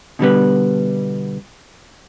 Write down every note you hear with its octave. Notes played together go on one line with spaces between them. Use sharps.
B2 D3 G3 B3